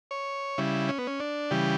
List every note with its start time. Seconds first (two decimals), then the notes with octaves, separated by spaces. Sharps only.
0.11 C#5
0.58 C#3 G3 E4
0.89 C#4
0.98 B3
1.07 C#4
1.20 D4
1.51 C#3 E3 G3 G4